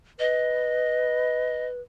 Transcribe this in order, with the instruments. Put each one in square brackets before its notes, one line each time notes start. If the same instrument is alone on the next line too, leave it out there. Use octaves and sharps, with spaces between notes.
[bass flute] B4 [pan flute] D#5